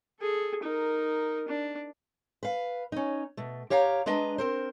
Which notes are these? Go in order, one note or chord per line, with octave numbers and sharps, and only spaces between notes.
G#4 A4
D#4 A#4
D4
B4 F5
C#4 D#4
B2 A3
G4 C#5 F5 A#5
G#3 D4 B4 D#5 A#5
C4 A#4 C5